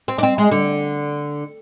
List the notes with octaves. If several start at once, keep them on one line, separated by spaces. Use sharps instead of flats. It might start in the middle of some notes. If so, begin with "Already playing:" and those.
C4
D4
C4
G#3
D3